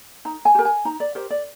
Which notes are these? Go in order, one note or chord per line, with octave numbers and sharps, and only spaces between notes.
D#4 A#5
G#5
G4 A#4
G#5
D#4 A#5
D5
G4 A#4 C5
D5